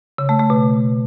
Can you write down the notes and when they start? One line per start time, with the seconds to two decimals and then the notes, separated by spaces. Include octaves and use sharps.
0.18 C#3
0.29 A3
0.39 A3
0.50 B2